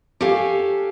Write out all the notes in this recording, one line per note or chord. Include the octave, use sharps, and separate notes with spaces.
G4 A4 C#5 F5 G#5